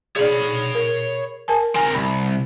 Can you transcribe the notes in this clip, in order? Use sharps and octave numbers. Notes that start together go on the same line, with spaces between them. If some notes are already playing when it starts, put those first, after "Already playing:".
G#4 C#5 D5 B5
A#4
A#4 G#5 A5
C4 A#4 G#5
C2 B5